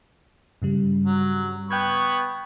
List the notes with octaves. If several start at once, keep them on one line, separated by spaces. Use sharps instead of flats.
G2 C#3 G3
F#3
B3 G5 B5 C#6 G6 G#6